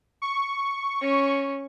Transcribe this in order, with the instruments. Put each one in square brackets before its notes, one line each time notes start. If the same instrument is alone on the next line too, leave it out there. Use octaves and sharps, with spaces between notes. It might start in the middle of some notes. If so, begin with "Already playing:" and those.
[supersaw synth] C#6
[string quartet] C#4